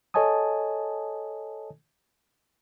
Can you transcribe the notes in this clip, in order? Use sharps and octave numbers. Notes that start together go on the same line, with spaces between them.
A4 C#5 D#5 G#5 A5 D#6